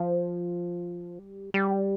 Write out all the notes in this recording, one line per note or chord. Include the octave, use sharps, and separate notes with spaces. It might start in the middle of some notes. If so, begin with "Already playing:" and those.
Already playing: F3
G3
G3